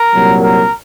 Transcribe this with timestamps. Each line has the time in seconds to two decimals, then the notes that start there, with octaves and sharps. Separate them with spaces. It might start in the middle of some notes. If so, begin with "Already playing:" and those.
Already playing: A#4
0.13 C2 A#2 F#3 A#3
0.44 A#4